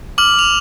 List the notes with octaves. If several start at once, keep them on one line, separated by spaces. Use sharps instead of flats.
D6 F6 F#7
F7